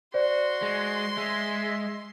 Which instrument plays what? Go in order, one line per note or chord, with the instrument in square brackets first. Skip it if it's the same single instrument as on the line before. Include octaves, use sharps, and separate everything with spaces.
[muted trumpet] F#4 [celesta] C5 D5 [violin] C6
[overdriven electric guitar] G#3
[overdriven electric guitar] G#3 [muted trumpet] E5